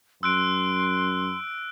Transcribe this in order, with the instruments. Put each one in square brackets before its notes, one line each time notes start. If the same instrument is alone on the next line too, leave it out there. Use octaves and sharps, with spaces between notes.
[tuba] F#2 [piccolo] C6 [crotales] E6 F#6 D7